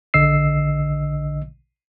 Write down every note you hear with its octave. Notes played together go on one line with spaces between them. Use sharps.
A#1 D3 D#5 E6 C7